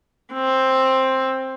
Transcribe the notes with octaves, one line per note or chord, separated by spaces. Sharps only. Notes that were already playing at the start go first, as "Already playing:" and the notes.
C4